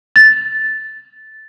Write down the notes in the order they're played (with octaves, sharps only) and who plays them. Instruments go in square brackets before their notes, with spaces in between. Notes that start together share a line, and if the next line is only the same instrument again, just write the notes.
[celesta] A6